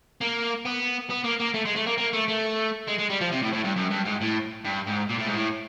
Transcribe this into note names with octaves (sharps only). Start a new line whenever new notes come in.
A#3
B3
B3
A#3
A#3
A3
G#3
A3
A#3
A#3
A3
A3
G#3
G#3
G3
F3
C3
A2
A2
G2
F#2
G2
G#2
A2
G2
G#2
A#2
A2
G#2
A2